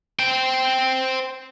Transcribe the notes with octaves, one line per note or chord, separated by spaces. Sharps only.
C5 G5